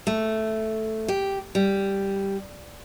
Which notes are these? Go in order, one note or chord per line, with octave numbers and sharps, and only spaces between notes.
A3
G4
G3